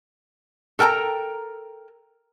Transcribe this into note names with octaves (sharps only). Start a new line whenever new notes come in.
A4 A#4 G5 A5 A#5